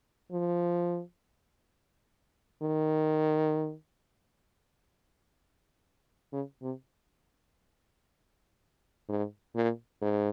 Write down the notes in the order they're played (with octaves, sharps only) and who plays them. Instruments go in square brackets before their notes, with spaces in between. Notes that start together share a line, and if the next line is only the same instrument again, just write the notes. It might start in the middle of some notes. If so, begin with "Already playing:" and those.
[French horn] F3
D#3
C#3
C3
G#2
A#2
G#2